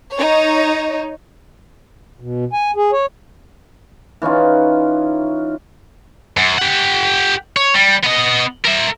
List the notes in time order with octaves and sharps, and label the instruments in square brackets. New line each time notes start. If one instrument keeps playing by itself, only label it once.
[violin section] D#4 C#5
[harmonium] B2
G#5
G#4
C#5
[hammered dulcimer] E3 C#4 D#4 F4
[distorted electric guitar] F#2
G4 F#5
C#5
G3
B3 D#5
A#4 E5